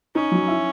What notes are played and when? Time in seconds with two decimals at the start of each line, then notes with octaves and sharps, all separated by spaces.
0.15 C#4 D#4
0.32 F#3
0.48 E4